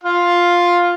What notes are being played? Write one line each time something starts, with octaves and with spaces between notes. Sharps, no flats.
F4 F5